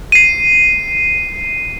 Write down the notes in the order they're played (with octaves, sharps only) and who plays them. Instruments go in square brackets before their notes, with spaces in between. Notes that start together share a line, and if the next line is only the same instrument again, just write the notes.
[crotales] C7 D#7